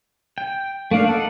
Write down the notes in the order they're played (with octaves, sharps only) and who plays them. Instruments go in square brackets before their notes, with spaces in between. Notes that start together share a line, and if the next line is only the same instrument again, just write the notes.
[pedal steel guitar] G5
[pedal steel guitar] A3 A#3 D4 [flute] F5
[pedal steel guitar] D#4 F#5 [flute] A4